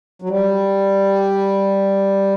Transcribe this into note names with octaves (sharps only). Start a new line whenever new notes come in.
F#3
G3